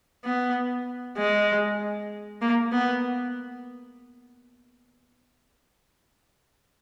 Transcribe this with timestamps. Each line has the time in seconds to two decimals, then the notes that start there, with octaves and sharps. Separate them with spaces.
0.24 B3
1.17 G#3
2.41 A#3
2.72 B3